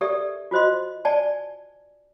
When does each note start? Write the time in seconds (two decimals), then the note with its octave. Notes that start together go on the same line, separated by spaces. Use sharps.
0.01 G4 A4 A#4 D5 E5
0.51 F4 F#4 C5 D#5 C6
1.05 D5 G#5 A5